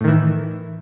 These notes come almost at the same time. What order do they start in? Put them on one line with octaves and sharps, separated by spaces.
A2 D#3 E3